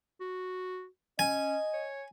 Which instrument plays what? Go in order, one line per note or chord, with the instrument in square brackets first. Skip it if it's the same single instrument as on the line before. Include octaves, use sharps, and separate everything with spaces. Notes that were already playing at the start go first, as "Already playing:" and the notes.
[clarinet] F#4
[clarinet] C#4 [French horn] D#5 [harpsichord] G#5
[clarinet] C#5